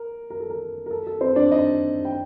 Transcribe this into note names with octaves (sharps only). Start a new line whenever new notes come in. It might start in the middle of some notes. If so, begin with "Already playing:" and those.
Already playing: A#4
A#4
A4
A#4
A#4
A4
A4
C4 C5
D4 D5
D#4 D#5
G5